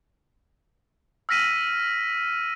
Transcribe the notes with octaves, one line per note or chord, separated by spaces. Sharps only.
E6 F6 A#6 B6 D#7